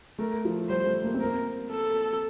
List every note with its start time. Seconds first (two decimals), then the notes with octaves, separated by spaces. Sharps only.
0.19 A3 A#4
0.45 F3
0.69 G3 C5
0.86 A3
1.04 A#3
1.14 C4
1.20 A#3 A#4
1.71 A4